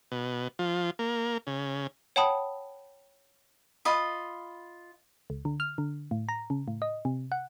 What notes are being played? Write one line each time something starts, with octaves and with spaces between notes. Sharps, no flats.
B2
F3
A#3
C#3
C#5 F#5 G5 A5 B5 D#6
F4 D#5 B5
C#2
D3
F6
D3
A2
A#5
C#3
A2
D#5
C3
F#5